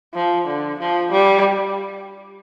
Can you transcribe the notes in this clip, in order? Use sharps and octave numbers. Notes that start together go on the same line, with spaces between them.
F3
D3
F3
G3